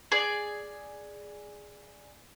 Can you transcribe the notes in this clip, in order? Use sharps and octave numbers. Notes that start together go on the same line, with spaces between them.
G#4 D5